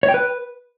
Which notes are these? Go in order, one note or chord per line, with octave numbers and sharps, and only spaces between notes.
C#5
G5
B4